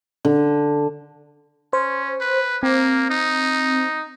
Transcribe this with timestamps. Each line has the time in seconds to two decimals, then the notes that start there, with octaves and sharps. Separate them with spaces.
0.25 D3
1.73 C#4 C5
2.21 B4
2.63 A#3 C4
3.10 D#4